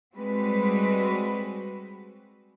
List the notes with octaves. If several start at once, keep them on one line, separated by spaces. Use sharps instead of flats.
G3 G#3 C4 F#4 B4